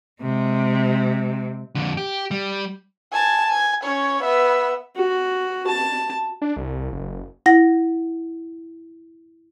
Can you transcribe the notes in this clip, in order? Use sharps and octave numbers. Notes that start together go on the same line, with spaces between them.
C3 G#3
F2 D3
G4
G3
G#5 A5
G#5
C#4 C#5
B3 E5
F#4
A5
D4
C2
F#1
E4 F#5 A#6